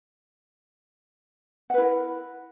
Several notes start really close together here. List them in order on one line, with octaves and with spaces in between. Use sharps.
F#5 B4 E4 A#4